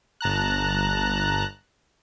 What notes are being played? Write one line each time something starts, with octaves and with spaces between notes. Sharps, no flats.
G1 A5 A#5 F#6